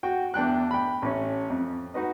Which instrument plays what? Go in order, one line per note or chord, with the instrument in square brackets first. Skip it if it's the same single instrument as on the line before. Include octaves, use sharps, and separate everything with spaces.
[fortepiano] F#4 G5
E2 D4 G5 F#6
G5 B5
A1 C#4
F2
D#4 F#4 B4 D#5